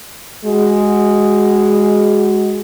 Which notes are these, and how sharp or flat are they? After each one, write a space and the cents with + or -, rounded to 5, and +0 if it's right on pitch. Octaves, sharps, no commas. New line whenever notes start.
G#3 +0 F#4 +15